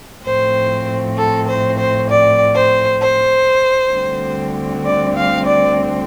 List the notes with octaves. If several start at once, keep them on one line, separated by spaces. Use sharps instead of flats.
A2 F3 C4 C5
A4
C5
C5
D5
C5
C5
D2 D3 G3 C4
D5
F5
D5